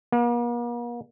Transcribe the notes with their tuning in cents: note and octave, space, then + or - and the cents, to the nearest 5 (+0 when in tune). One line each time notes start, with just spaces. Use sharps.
A#3 +45